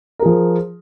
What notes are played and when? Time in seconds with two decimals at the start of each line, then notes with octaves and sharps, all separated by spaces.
0.19 A#4
0.22 G#4
0.25 F3